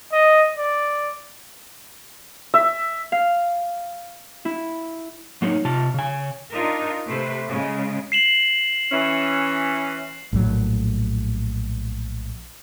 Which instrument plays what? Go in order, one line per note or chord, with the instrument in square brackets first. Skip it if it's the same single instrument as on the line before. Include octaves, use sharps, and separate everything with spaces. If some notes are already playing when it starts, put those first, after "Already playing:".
[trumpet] D#5
D5
[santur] E5
[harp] F5
E4
[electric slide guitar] F#3 A#3 C#4 D#4
C3 F4 A5
C#3 G#5
[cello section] D4 D#4 F4 A#4
C3 A3 B4 C5
C#3 G#3
[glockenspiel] C7 E7 F#7
[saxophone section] E3 C#4
[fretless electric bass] A#1 A2 D3 F#3